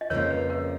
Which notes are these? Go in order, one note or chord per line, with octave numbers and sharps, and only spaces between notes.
D#5
F2 C#3 F3 A#3 A#4 C#5
B4
A#4